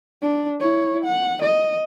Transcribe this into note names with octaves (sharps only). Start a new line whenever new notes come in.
D4
E4 C#5
F#5
D#5